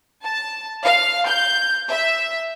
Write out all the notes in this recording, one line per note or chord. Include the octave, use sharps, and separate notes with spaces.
A5
F5
G6
E5